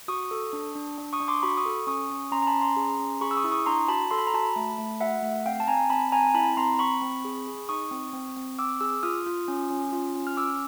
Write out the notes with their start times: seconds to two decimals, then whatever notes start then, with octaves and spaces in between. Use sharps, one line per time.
0.08 F#4 C#6 D#6
0.31 A4
0.53 D4
0.75 D4
0.98 D4
1.13 C#6 D#6
1.20 D4
1.28 C6 D6
1.43 F#4 B5 C#6
1.57 C#6 D#6
1.66 A4
1.87 C#4 C#6 D#6
2.10 C#4
2.32 C#4 A#5 C6
2.42 A#5
2.47 A5 B5
2.54 C#4
2.61 A#5 C6
2.77 G#4
2.99 C#4
3.21 G#4 B5 C#6
3.31 E6
3.37 C#6 D#6
3.44 E4
3.52 C#6 D#6
3.66 D4 A#5 C6
3.88 F#4 A5 B5
4.11 A4 C6
4.18 B5
4.27 A#5
4.34 F#4 A5 B5
4.56 A3
4.78 A3
5.00 F#4 E5 F#5
5.23 A3
5.46 C4 F5 G5
5.60 A5
5.68 C4 G#5 A#5
5.90 C4 A5 B5
6.12 C4 G#5 A#5
6.34 E4 A5 B5
6.57 C4 A#5 C6
6.79 C4 B5 C#6
7.02 C4
7.25 G#4
7.47 G#4
7.69 D#4 C#6 D#6
7.91 C4
8.13 C4
8.37 C4
8.59 C4 D6 E6
8.81 G#4 D6 E6
9.03 F4 D#6 F6
9.26 F4
9.48 C#4
9.70 C#4
9.92 F4
10.15 C#4
10.27 F6
10.37 C#4 D6 E6